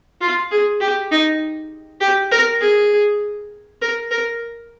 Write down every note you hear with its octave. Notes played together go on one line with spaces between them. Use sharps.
F4
G#4
G4
D#4
G4
A#4
G#4
A#4
A#4